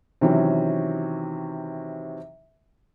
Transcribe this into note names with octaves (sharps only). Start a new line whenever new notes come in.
C3 D#3 E3 F#3 C#4